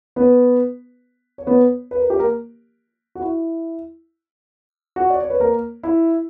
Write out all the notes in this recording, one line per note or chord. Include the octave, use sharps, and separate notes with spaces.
B3 B4
C#5
B3 B4
B4
A#4
G4
A#3 A#4
F#4
E4
F#4
D5
C#5
B4
A#3 A#4
E4 E5